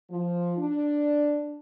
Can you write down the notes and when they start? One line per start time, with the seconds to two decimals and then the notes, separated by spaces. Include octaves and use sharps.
0.10 F3
0.58 D4